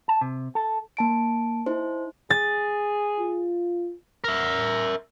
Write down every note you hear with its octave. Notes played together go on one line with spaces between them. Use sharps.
A5
C3
A4
A#3 A5 D7
D#4 E4 C5
G#4 A6
F4
A#4 E5